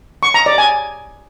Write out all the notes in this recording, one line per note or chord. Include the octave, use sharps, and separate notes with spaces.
C#6
A#5
D5
G#5